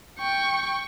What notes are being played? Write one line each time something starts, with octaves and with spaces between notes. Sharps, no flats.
G5 C#6